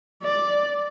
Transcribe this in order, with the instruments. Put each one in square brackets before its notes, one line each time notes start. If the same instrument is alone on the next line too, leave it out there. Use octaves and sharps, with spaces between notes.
[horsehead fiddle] D5